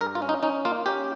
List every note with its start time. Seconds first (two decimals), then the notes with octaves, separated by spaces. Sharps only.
0.01 G2 A#4
0.15 F4
0.22 C#4
0.29 D#4
0.43 C#4 D#4
0.65 A#3 F4
0.86 C#4 G4